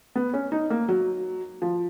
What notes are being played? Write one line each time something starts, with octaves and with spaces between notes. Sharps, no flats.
B3
C#4
D#4
A#3
F#3
F3